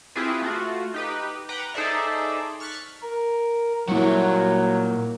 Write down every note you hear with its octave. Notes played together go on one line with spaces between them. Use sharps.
C4 E4 F4 G4 G#4 B4
A3 F4 F#4
D#4 G4 B4
B4 F#5 G5 A#5 D6
D#4 G#4 A4 C5 D5 E5
C#6 F6 F#6 A6 B6
A#4
A#2 F#3 G3 A#3 E4 F#4